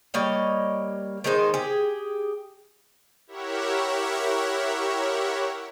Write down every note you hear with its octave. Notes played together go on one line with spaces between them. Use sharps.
G3 A#3 C#5 D#5
D#3 G#3 D#4 C5
G4 G#4
E4 G4 A#4 C#5 E5 F#5